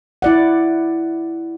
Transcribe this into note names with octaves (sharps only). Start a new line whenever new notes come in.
E4 D5 F#5